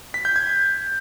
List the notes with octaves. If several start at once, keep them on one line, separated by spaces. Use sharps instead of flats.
B6
G6
G#6